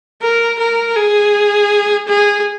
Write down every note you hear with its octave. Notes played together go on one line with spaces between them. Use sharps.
A#4
A#4
G#4
G#4